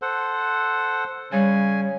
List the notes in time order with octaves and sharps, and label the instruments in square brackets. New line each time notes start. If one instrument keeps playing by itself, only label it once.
[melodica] A4 C5 F#5
[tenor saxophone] C#3 [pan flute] G3 [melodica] G#5